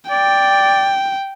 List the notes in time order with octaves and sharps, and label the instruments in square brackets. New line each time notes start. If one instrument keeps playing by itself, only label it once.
[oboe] D5 [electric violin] G5